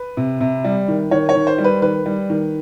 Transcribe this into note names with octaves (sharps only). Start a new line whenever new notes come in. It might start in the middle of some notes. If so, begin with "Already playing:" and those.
Already playing: B4
C3
C3
G3
D#3
D#3 C#5
C#5
D#3
C5
G3
B4
D#3 B4
G3
D#3